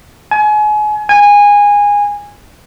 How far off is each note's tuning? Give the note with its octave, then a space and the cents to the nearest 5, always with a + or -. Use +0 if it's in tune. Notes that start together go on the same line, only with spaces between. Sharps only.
G#5 +30
G#5 -20